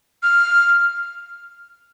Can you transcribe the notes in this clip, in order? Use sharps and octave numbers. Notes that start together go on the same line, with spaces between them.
F6